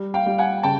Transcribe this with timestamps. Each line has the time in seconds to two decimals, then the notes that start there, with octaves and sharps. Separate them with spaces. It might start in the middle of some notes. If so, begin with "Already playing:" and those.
Already playing: G3
0.14 F5 G5
0.26 G3
0.38 F#5 G#5
0.63 C#3 G5 A5